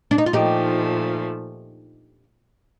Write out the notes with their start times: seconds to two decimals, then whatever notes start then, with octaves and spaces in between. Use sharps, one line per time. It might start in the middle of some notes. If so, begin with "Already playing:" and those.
0.11 D4
0.18 D#4
0.26 F4
0.33 A#2 F3 A3 D#4 G4